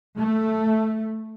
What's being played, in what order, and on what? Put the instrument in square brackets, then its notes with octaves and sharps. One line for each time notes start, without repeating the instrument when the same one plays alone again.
[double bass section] A3